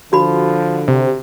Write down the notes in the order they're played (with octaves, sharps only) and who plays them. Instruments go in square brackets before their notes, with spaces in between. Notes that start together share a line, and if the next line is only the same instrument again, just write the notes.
[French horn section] D3 [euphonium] F3 [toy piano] F#4 B5
[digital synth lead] C3